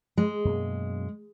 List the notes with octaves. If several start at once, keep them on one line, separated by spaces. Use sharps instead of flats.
G#3
F#2 B2 A#3